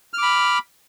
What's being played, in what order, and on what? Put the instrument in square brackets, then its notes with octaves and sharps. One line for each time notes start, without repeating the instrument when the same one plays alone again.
[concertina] F6
D6
B5